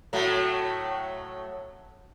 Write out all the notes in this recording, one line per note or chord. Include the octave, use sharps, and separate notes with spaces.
A2 F#3 A3